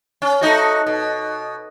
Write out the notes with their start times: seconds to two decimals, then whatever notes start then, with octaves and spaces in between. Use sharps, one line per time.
0.22 C#4
0.41 A3 D#4 F#4
0.87 B2